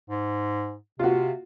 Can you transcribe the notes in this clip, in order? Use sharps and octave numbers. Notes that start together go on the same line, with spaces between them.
G#2
C3 F4 F#4